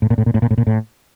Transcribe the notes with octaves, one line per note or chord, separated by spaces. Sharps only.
A2
A#2
A2
A#2
A2
A#2
A2
A#2
A2